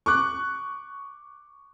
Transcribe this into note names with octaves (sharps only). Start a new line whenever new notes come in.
C#6 D6 F#6